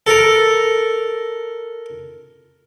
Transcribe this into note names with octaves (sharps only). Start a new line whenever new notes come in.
A4 A#4